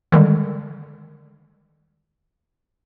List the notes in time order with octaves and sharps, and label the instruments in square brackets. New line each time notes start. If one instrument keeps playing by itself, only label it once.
[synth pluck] D3 D#3 G3 G#3